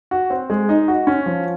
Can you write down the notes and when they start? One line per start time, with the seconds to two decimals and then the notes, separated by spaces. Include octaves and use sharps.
0.11 F#4
0.30 C4
0.50 G#3
0.69 D#4
0.88 F#4
1.07 C#4
1.26 F3